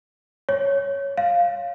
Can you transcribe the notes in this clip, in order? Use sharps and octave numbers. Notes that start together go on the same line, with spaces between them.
C#5
F5